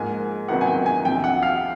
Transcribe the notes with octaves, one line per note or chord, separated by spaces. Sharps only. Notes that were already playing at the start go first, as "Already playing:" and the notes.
Already playing: G#2 F3 A#3 G#5
C#2 C3 D#3 F#3 B3 F#5
G#5
G5
G#5
D2 C3 F3 G5
F#5
F5